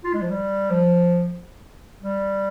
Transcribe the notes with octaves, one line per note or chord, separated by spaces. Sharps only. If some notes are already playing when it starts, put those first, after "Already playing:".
F4
G#3
F3
G3
F3
G3